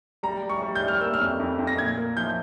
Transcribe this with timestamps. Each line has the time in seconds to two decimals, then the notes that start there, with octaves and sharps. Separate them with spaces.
0.23 G3 A#5
0.43 G3
0.49 C#6
0.62 G3
0.75 G6
0.82 G3
0.88 F6
1.01 A#3 E6
1.14 F6
1.20 F2
1.40 F2
1.59 F2
1.67 A#6
1.78 A#2 G#6
1.98 A#3
2.17 F3 G6